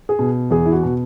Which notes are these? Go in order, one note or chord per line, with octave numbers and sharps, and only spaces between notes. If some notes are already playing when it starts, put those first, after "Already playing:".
G#4
B2
E2 G#4
E4
F#4
B2